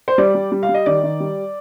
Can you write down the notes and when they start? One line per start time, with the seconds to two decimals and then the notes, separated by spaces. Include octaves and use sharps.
0.08 C5
0.18 G3 D5
0.35 G3
0.52 G3
0.63 F5
0.69 G3
0.74 D#5
0.86 D#3 D5
1.03 D#3
1.20 G3